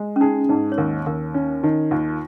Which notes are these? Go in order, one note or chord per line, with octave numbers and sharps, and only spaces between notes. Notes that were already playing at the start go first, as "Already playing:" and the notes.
Already playing: G#3
C#4
D#4 G#4
G#2 D#4
C#5
D#2 A#4
D#2 A#4
C#4
D#3 D#4
D#2 F4